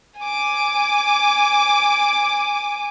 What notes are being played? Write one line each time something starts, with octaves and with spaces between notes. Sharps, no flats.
G#5 D6